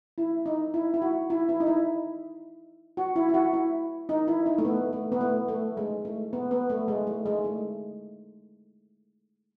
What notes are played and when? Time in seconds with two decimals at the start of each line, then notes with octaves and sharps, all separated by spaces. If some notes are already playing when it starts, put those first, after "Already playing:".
0.18 E4
0.46 D#4
0.74 E4
0.94 E4
1.02 F#4
1.30 E4
1.49 E4
1.60 D#4
1.67 E4
2.97 F#4
3.16 E4
3.29 E4
3.34 F#4
3.54 E4
4.09 D#4
4.28 E4
4.46 D#4
4.58 A3
4.65 B3
4.93 A3
5.12 B3
5.21 A3
5.48 A3
5.77 G#3
6.05 A3
6.33 B3
6.51 B3
6.70 A3
6.88 G#3
7.07 A3
7.26 G#3
7.44 A3